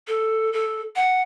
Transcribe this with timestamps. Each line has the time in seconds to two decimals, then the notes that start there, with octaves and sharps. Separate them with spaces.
0.08 A4
0.53 A4
0.96 F#5